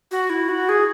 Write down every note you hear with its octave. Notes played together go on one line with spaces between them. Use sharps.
F#4
E4
F#4
G#4